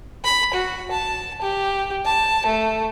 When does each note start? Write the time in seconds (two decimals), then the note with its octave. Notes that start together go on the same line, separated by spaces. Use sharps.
0.24 B5
0.54 F#4
0.91 A5
1.42 G4
2.05 A5
2.46 A3